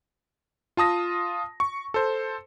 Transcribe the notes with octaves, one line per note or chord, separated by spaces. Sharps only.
F4 A5 D#6 A#6
C#6
A4 C5